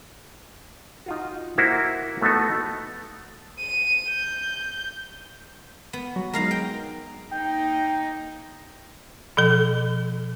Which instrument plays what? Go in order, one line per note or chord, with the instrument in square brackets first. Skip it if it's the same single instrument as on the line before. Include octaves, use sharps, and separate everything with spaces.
[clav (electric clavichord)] D#4 F4 F#4
A#3 E4 F#4 A#4 C5
A3 B3 D#4 F#4 A4
[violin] D#7
G6
[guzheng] B3
[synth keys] F#3
[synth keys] G#3 B3 D#4 [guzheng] A#4 F5 A#5
[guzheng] G5
[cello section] A#3 D#4 [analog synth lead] G5
[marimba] B2 F3 A4